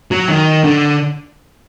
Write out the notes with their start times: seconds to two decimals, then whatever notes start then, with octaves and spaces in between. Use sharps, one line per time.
0.11 F#3
0.29 D#3
0.64 D3